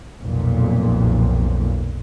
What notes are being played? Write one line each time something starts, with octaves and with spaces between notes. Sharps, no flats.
B1 F2 A#2